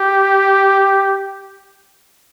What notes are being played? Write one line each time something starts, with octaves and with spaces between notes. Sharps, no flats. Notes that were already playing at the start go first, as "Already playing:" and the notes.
Already playing: G4